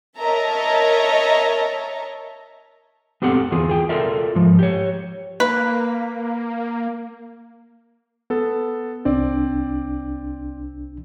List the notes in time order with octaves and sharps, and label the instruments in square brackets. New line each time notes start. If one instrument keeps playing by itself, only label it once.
[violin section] A#4 C#5 D#5 E5 A5 A#5
[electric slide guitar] B3 C4 G4 A4 F#5
E2 E3 F4 G#4
G#4 G5
F4 A4 A#4 D5 E5
G#2 F3
G4 C#5
[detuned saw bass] A#3 [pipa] B4
[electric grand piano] B3 A4
[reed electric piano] C2 D4 [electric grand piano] C4 D5